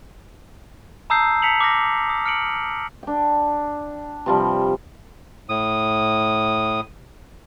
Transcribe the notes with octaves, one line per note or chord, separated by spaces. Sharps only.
A5 A#5 D#6 E6 G6 C7
A5 B6 C#7 F7 F#7
D6 F6 A#6
D#6
F6 C#7 D7 F#7
D4 G5
C3 F3 G3
A2 D#6